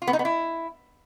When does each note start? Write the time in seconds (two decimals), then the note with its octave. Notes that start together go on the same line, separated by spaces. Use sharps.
0.02 F4
0.07 B3
0.13 D#4
0.19 B3
0.25 E4